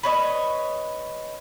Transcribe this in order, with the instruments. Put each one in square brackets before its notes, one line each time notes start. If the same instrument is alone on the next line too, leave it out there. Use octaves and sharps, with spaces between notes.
[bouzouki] B4 C#5 D#5